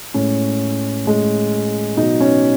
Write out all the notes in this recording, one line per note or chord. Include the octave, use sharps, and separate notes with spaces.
A2 G#3 C#4
A2 G#3
B2 F#3 D#4
C#4